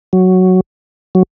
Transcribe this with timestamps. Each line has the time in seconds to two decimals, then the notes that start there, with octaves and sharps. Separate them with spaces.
0.13 F#3
1.15 F#3